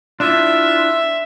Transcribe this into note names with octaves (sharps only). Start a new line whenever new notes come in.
D4 E4 F4 E5